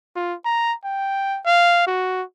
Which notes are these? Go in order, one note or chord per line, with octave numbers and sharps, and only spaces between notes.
F4
A#5
G5
F5
F#4